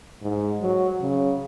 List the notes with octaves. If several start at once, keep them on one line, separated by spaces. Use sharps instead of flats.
G#2
F#3
C#3